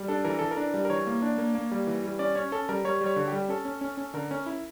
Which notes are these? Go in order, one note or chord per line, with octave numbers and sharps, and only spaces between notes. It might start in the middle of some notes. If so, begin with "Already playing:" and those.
Already playing: G3
D4 A4
E3 A#4
E3 A4
A#4
D4
G3
A#4
E3 C#5
A#3
D4
A#3
A#3
G3
E3
G3
C#4 D5
C#4 C#5
C#4 A4
G3 A#4
G3 C#5
G3
C#5
D3
G4
G3
C#4 A4
C#4
C#4
C#4
D3 A#4
C#4
E4